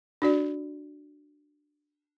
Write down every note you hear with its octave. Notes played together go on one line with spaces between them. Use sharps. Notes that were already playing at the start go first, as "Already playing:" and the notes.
D4 F#4 D5